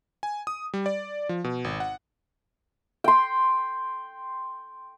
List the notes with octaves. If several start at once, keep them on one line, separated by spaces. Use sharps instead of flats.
G#5
D#6
G3
D5
F3
B2
G#1
F#5
G5 C6